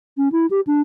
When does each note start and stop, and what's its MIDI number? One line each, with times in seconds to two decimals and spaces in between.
0.18 0.29 61
0.32 0.46 64
0.50 0.61 67
0.67 0.81 62